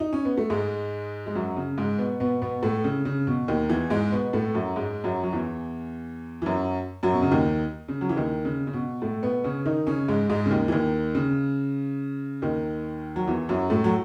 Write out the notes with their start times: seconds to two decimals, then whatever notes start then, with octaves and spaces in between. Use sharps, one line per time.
0.00 D#4
0.13 C#4
0.25 B3
0.37 A3
0.50 G#2 G#3
1.26 G#3
1.35 F#2 F#3
1.57 C#3
1.78 G#2 G#3
1.98 B2 B3
2.20 B2 B3
2.42 B2 B3
2.63 A2 A3
2.84 C#3
3.05 C#3
3.27 B2
3.48 D#2 D#3
3.69 E2 E3
3.90 G#2 G#3
4.12 B2 B3
4.33 A2 A3
4.54 F#2 F#3
4.76 G#2 G#3
5.04 F#2 F#3
5.23 F#3
5.33 E2 E3
6.42 E3
6.46 F#2 F#3
7.03 F#2 F#3
7.12 B2
7.23 C#3
7.31 D#2 D#3
7.88 C#3
8.01 F#3
8.09 E3
8.17 D#2 D#3
8.45 C#3
8.67 C#3
8.73 B2
9.02 A2 A3
9.23 B2 B3
9.44 C#3 C#4
9.65 D#3 D#4
9.87 C#3 C#4
10.08 G#2 G#3
10.30 G#2 G#3
10.46 C#3
10.50 D#2 D#3
10.68 E3
10.72 D#2 D#3
11.15 C#3
12.42 D#2 D#3
13.16 F#3
13.28 E2 E3
13.49 F#2 F#3
13.70 A2 A3
13.84 F#3